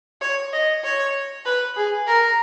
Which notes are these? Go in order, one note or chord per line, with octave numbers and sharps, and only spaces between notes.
C#5
D#5
C#5
B4
G#4
A#4